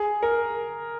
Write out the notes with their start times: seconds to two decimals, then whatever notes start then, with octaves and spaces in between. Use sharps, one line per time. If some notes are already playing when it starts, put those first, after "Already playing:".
Already playing: G#4
0.22 A#4